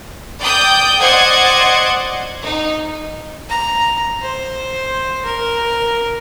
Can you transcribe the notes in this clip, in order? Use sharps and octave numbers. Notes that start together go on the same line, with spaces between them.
D5 G5 D#6 G6
C5 D5 D#5 F#5 G#6
D#4
A#5
C5
A#4